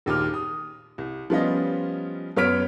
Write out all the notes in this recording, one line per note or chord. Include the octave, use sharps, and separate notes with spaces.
A#1 D#2 D6 F6
D#6
C2
F3 G3 B3 C#4 F4 D#5
F#2 B3 C#5 F6 B6 D7